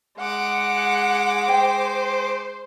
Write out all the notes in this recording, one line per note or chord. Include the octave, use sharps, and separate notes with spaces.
G#3 F#5 D6
C5 G5